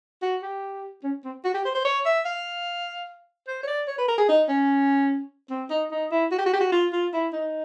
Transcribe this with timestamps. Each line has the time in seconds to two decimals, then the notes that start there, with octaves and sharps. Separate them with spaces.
0.22 F#4
0.43 G4
1.03 C#4
1.24 C4
1.44 F#4
1.54 G4
1.65 C5
1.75 C5
1.85 C#5
2.06 E5
2.25 F5
3.47 C5
3.63 C#5
3.67 D5
3.88 C#5
3.98 B4
4.08 A#4
4.18 G#4
4.28 D#4
4.48 C#4
5.50 C4
5.70 D#4
5.91 D#4
6.11 E4
6.31 F#4
6.38 G4
6.46 F#4
6.53 G4
6.60 F#4
6.72 F4
6.92 F4
7.13 E4
7.33 D#4